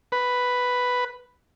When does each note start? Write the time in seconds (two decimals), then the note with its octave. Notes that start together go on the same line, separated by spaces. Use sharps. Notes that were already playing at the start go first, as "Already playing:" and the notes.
0.12 B4